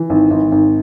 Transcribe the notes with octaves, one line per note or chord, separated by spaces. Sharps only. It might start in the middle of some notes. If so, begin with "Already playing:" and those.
Already playing: E3
G#1
G#1
G#1